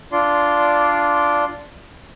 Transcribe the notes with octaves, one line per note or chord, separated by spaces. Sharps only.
D4 F4 D5 C6